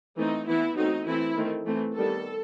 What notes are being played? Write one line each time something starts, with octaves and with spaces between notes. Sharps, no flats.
E3 A3 C4 D#4
E3 B3 E4
F#3 A3 C4 D#4
E3 A3 C4 E4
D#3 A3 C4
E3 A3 C4
D#3 G3 B3 A4